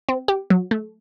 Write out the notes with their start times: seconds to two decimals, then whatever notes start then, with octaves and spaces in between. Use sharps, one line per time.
0.09 C4
0.28 G4
0.50 F#3
0.71 A3